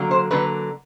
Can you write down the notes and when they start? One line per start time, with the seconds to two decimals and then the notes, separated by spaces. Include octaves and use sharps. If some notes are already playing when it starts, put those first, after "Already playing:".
Already playing: D3 F#3 A#3
0.11 C5
0.31 D3 F#3 A#3 B4